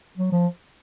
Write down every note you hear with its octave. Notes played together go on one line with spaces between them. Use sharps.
F#3
F3